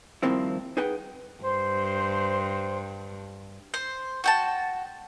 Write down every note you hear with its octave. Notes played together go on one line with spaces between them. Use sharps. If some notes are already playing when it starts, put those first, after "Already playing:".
G2 D#3 F3 A#3 C4 E4
D#4 G#4 B4 F#5 G5
G2 C5
C5
F#4 G5 A5